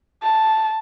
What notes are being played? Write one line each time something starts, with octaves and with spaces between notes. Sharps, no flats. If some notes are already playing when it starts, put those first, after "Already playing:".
A5